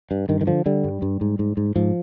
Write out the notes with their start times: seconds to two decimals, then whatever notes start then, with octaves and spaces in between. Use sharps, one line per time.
0.11 G2
0.29 G2 D#3
0.41 D#3
0.47 D3 F3
0.66 D3 G3
0.84 G2
1.02 G2
1.21 G#2
1.39 G#2
1.57 G#2
1.76 G#2 F3